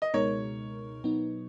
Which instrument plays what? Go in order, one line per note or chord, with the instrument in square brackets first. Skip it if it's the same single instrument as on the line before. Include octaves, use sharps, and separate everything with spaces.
[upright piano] D#5
[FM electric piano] C#2 B2 G#3 D#4 A#4 [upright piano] C#5
[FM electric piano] B2 F#3 B3 D#4